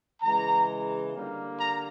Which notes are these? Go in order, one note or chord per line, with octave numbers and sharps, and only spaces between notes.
C#3 E3 G#3 A#5
D3 G3 A#3
A#5